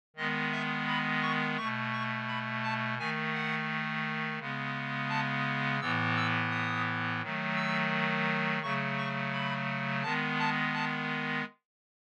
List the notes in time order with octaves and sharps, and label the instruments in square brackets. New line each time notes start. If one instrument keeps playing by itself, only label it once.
[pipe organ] D#3 G#3 B3 D#5
E5
B5
C#6
B2 A3 C#6
C#6
B5
A5
D#3 A3 G#5
F#5
C#3 G#3 B3
A5
A2 E3 B3 E6
E6
D#6
D#3 F#3 A3
E6
C#3 F#3 A3 C#6
C#6
B5
D#3 G#3 B3 A5
A5
A5